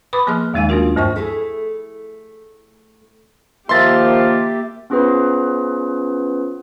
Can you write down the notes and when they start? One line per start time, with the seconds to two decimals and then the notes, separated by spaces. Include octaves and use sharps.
0.13 B4 B5 D6 D#6
0.27 F3 A#3 G#4 C6 F6
0.54 D#2 D#3 G#3 D#4 F5 G#5
0.69 A3 A#3 D4 F4 F#4 A#4
0.96 D2 G2 C5 G5 C#6
1.16 A3 E4 G#4
3.69 D#3 F3 A#3 F4 G4 E5 C6 A6
4.90 B3 C#4 F4 G#4 B4 C5